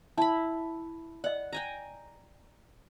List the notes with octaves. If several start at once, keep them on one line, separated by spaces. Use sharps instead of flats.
E4 A5 B5
D5 D#5 F#5
G5 G#5 A#5